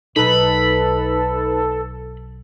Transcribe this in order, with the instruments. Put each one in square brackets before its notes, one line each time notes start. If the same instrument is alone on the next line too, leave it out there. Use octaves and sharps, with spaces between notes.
[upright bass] B1 [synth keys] D#4 B4 [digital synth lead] A4 [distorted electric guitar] B5